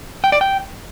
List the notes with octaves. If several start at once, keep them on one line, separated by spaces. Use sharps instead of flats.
G5
D5
G5